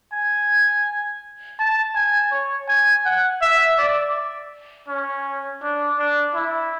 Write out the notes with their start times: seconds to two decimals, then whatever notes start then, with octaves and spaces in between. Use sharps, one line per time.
0.13 G#5
1.59 A5
1.95 G#5
2.32 C#5
2.68 G#5
3.05 F#5
3.42 E5
3.78 D5
4.88 C#4
5.63 D4
5.99 D4
6.35 E4